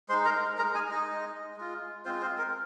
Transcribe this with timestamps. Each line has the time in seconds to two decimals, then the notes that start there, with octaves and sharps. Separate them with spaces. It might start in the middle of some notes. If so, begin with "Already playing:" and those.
0.09 G#3 C5 C6
0.13 D#4
0.25 A#4 A#5
0.58 G#3 A#4 A#5
0.63 D#4
0.74 G#4 G#5
0.91 D#4 D#5
1.07 G#3 D#4
1.57 G#3 F4
2.05 G#3 C4 F4 C5
2.22 C4 C5
2.38 A#4